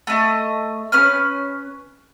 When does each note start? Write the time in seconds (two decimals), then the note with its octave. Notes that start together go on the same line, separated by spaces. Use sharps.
0.07 A3 D#5
0.92 C#4 B4 F6